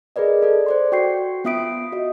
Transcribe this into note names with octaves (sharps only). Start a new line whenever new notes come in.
G#4 A#4 B4 D5 D#5
A4 D5
C5 D5 C6
F#4 G5 C#6 G6 C7
B3 F4 E5 D#6 B6 D7
F#4 D#5